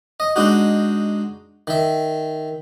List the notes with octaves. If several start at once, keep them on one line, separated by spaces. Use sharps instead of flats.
D#5
G#3 D4 D#4 F#4
D#3 E5